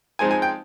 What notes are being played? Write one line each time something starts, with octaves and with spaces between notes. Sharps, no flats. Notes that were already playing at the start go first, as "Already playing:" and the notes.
F3 G#3 C4 D#4 G#5
G#5
G5